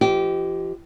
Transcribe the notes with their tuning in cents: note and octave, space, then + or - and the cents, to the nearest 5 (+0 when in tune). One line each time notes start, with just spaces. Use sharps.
F3 -35 G4 -20 D#5 +0